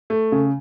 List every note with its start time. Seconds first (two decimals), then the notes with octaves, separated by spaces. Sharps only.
0.10 A3
0.32 C#3